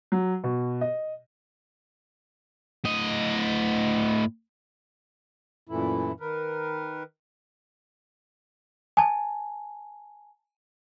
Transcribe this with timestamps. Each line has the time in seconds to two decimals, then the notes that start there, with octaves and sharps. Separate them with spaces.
0.12 F#3
0.44 B2
0.81 D#5
2.85 A2 D#5
5.69 F#2 A#2 E3 A3 E4
6.20 D#3 A#4 B4
8.97 G#5 A5